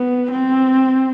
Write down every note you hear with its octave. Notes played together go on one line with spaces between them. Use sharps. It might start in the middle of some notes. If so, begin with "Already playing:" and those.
Already playing: B3
C4